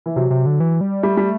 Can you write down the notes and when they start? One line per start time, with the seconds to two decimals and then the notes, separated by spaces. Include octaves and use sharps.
0.06 E3
0.16 C3 F#3
0.31 C3
0.46 D3
0.60 E3
0.81 G3
1.03 G3 A3
1.17 G3